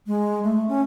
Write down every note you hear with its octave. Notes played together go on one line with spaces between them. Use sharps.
G#3
A3
C#4